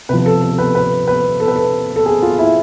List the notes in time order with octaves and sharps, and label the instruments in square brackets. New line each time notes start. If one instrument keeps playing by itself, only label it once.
[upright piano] C3 F3 B4
A4
A4
B4
B4
B4
A4
B4
A4
A4
G#4
F4
E4